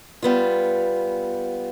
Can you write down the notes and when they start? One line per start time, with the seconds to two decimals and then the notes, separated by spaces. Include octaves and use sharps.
0.22 G3 B3 F4